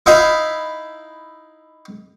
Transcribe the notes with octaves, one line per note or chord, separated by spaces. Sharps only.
D#4 E4 E5 F5 B5